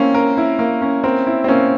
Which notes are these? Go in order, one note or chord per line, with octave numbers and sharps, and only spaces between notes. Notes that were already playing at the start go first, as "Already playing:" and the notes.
Already playing: A#3 C4 C#4 E4
A#4
E4
A#3
C#4
C4 A#4
E4
C4
A#3 C#4